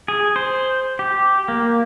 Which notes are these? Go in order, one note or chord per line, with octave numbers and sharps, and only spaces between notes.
G#4
C5
G4
A#3